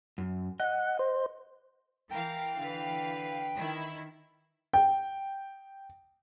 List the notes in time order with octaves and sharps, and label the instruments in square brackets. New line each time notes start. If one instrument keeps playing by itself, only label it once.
[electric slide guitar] F#2
[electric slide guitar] D#5 [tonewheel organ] F#5
[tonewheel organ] C5
[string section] E3 F5 [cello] A#4 [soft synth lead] G5
[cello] D3 B4
[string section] D#3 E4
[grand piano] G5